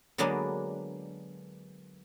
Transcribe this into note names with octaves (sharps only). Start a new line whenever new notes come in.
D3 F#3 G#3 A#3 B3 D4